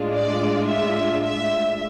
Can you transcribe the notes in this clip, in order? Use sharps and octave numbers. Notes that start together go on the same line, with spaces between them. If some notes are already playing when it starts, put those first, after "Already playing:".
Already playing: A2 G#3 D4 F4
D5
E5
E5